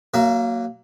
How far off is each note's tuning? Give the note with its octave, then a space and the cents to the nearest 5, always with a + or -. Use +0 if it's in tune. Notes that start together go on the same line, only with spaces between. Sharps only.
F#3 +10 A#3 +0 E5 +40